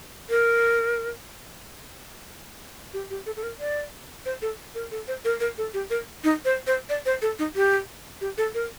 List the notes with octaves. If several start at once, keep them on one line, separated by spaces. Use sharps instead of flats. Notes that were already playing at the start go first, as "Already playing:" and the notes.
A#4
G4
G4
A4
A4
A#4
D5
C5
A4
A#4
A4
C5
A#4
A#4
A4
G4
A#4
D#4
C5
C5
D5
C5
A4
D#4
G4
G4
A4
A#4